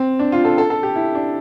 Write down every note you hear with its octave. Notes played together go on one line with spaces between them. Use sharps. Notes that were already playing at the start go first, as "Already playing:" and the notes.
Already playing: C4
D4
F4
A4
A4
A4
G4
E4
D4